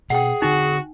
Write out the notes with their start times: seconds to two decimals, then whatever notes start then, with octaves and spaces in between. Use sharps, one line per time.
0.10 B2 C4 G#4 F#5 G5
0.42 D3 C4 D#4 F#4